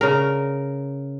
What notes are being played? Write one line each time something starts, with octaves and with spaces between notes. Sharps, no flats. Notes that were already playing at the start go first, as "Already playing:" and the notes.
C#3 A#4